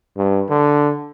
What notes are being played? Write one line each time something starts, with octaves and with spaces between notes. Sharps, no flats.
G2
D3